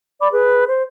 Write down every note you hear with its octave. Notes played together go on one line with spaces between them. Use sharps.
D5 B5 D6
G#4 B4
C5